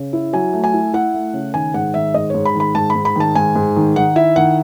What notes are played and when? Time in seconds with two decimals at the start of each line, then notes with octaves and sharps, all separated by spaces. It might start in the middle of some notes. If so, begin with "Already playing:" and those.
Already playing: C#3
0.13 E4
0.33 F#3 G#5
0.53 A3
0.64 G#5
0.73 E4
0.93 E4 F#5
1.14 A3
1.33 C#3
1.54 D#3 G#5
1.74 G#2 F#5
1.94 D#3 E5
2.14 G#2 D#5
2.30 G#2 C#5
2.45 B5
2.55 D#3
2.60 B5
2.75 G#2 A5
2.90 B5
2.95 G#2
3.05 B5
3.16 D#3 A5
3.35 G#2 G#5
3.56 G#2
3.76 D#3
3.96 D#3 F#5
4.16 E4 E5
4.36 D#3 F#5